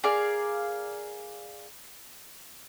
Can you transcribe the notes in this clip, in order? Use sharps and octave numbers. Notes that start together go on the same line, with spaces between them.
G#4 A#4 D5 F5